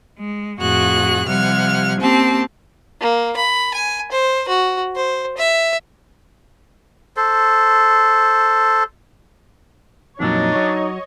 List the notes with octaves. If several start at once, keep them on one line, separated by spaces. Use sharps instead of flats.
G#3
F2 A2 F#4 G#4 F#6
C3 F3 G3 F#5 F6 G#6
A#3 C4 C#4 G4 A5
A#3
B5
G#5
C5
F#4
C5
E5
A4 C5
F2 A#2 F#3 D4 D#4 C#5 D#5
F#3